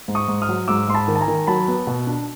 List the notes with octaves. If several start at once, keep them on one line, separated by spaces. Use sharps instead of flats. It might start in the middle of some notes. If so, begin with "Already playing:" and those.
G#2
C#6 D#6
G#2
D#6 F6
F#3
G#2 D6 E6
G#2 C6
A5 B5
D#3
A5
G#5 A#5
D#3
F#3 A5 B5
B3
B2
D4